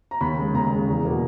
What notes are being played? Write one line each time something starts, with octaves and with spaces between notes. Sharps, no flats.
A#5
D#2 B5
C#3 G#3
D#2 A#5
C#3 G#3
E2
B2 A#3